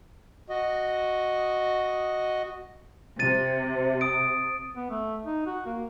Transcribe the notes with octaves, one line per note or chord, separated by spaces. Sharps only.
F#4 D#5
C3 A6 D#7
D#6 D7
B3
A3
D#4
F#4
A#3